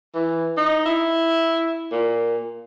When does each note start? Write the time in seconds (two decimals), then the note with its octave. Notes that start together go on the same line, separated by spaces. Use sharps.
0.15 E3
0.57 D#4
0.86 E4
1.92 A#2